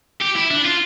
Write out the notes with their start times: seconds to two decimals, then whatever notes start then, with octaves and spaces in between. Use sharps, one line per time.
0.22 G4
0.36 E4
0.51 D4
0.65 F4